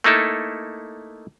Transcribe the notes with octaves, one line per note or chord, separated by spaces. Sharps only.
A3 A#3 D#4 E4 A4